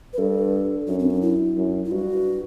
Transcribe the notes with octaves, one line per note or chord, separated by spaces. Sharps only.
B4
G2 A4
F#2 D4
C4
D4
E4
F#2
E4
G2 F#4